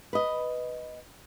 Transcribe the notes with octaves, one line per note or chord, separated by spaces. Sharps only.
B4 D#5